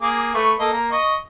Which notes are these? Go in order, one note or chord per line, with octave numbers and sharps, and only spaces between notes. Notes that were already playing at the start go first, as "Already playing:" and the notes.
A#3 G#4 D6
A3 B4 C#6
A#3 A4 D#5
A#3 A#5
D#5 C#6